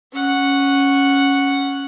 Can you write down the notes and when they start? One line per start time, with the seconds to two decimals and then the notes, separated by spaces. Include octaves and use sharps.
0.12 C#4 F#5